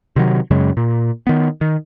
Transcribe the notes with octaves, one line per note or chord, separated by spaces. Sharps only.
C3 D#3 F#3
F#2 C#3 F#3 G#3
A#2
D#3 B3
D#3